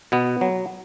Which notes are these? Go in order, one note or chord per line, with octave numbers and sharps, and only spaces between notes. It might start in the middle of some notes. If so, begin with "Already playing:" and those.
B2 B3
F#3